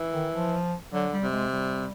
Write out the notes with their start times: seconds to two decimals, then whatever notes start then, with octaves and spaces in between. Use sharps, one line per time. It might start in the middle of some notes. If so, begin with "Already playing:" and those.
Already playing: E3
0.13 D#3
0.33 F3
0.93 D3 F#3
1.13 G3
1.23 C3
1.33 G#3
1.53 G3